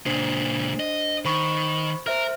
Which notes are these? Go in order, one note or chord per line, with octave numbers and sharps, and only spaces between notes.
C#2 A#2 D4 C5 C7
D#5
D#3 C5 B5 C#6
A#4 C5 E5 F6